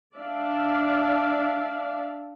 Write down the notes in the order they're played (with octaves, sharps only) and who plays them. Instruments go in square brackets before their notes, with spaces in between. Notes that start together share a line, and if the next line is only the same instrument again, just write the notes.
[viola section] D4 D5 E5 F5